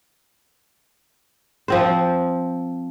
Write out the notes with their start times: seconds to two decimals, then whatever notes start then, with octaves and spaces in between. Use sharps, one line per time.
1.68 F3 C4 C5